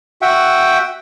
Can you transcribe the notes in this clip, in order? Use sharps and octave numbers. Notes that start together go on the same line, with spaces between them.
F#4 E5 F#5 G5